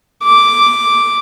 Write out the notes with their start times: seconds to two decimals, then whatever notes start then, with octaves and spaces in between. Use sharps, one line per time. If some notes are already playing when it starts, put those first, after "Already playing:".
0.23 D6